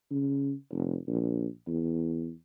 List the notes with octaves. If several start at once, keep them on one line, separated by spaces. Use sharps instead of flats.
C#3
F1
A#1
E2